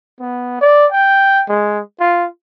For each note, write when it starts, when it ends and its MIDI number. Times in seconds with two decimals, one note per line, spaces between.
0.20 0.58 59
0.61 0.86 74
0.92 1.43 79
1.49 1.80 56
2.00 2.26 65